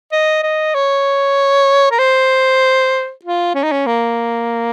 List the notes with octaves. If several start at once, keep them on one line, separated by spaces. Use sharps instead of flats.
D#5
D#5
C#5
A#4
C5
F4
C#4
D#4
C#4
A#3